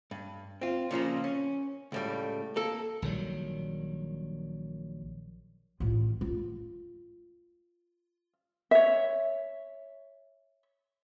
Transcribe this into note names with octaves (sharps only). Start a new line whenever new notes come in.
G2
C4 F4
A#2 C#3 F3 A#3
C#4
C#2 A2 G3
A#3 A4
A#1 D#3 F#3 G3
A1 F4
F4
C#5 E5